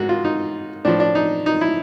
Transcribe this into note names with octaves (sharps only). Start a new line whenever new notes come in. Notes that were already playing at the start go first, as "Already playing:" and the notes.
Already playing: G#2 F#4
F4
D#4
A2 F3 D4
D4
D#4
D#4
E4